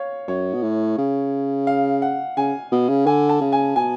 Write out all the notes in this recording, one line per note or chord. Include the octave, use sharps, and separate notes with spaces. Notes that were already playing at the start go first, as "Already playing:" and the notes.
Already playing: C#5 F5
F#2 C#5
B2
A2
C#3
F5
F#5
C#3 G#5
B2
C#3
D3 G#5
A5
C#3
G#5
B2 G#5